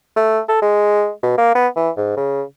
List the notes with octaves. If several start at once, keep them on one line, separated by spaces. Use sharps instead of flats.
A3
A4
G#3
B2
A#3
B3
E3
G#2
C#3